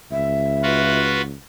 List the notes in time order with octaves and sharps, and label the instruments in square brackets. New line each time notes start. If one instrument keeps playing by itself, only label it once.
[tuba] C#2 [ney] E5
[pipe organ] F4 F#4 B4